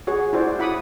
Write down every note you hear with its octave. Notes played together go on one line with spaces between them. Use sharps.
F#4 G#4 C#5 F#5
E4 F#4 C5 D5
E4 F#5 B5 D6 D#6